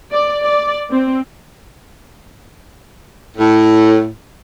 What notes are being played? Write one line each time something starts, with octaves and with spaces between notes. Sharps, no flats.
D5
D5
C4
A2